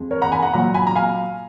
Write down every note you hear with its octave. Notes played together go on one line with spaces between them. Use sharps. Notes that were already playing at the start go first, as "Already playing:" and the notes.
Already playing: F2 F3 G#3
A#4 C#5
F#5 A#5
G#5 B5
F#5 A#5
A#2 F#3 F#5 A#5
G#5 B5
A#5
F5 G#5